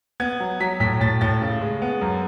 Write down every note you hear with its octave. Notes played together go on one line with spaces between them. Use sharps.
B3 G#6
F#3
F#3 B6
A2 B6
A2 A6
A2 A6
C#3
G#3
B3
F#2